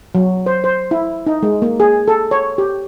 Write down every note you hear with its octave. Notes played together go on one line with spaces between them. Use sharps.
F#3
C5
C5
E4
D#4
G#3
A#3
G#4
A4
C#5
G4